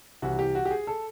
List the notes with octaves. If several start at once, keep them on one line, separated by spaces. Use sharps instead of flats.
C2 C3 E3 F#4
G4
F#4
G4
G#4
A4